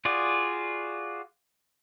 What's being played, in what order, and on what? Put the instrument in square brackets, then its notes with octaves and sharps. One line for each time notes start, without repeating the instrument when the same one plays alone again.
[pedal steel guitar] F4 F#4 G#4 D5